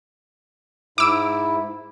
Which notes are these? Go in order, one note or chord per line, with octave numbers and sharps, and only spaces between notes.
G#2 E4 D6 E6 D7